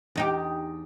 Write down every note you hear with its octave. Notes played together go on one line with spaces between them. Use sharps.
E2 D#4 G4